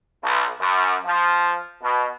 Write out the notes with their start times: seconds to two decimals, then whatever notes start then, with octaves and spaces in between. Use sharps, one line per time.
0.23 B1
0.59 F#2
1.06 F3
1.83 B2